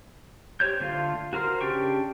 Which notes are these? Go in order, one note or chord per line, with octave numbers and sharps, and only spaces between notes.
G4 C5 C#5 G6
D3 A3 F4 F5
F#4 A#4 C5 F6
C#3 D4 G4 G5 C#6